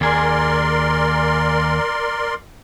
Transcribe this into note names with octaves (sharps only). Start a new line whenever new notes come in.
D#2 G#4 A#4 D5 C6